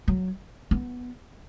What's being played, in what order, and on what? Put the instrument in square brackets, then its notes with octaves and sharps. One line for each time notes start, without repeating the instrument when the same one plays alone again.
[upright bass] F#3
B3